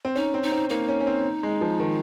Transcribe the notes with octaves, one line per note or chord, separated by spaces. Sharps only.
C4
C#4 D#4
C4
D#4
C4
A#3 D#4
C#4
C#4
C4
G#3
F3
D#3